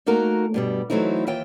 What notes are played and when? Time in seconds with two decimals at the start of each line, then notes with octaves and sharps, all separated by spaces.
0.06 A3 A#3 D#4 F#4 A#4
0.54 G2 B2 G3
0.90 E3 F#3 A3 C4 D#4 E4
1.27 D#2 E3 F4 E5 G5